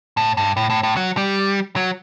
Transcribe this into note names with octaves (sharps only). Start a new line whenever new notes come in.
A2
G2
A2
A2
A2
F#3
G3
F#3